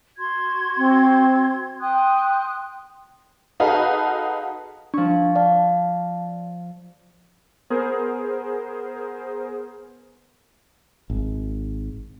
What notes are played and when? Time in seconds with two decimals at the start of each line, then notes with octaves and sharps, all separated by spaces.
0.18 F#4 C6 G#6
0.78 C4
1.82 G5 C6 D#6 F#6
3.60 D#4 F#4 G#4 A4 B4 F5
4.94 F3 D4 C#6
5.36 D5 F5 A5
7.70 B3 G#4 A#4 C5
11.10 G#1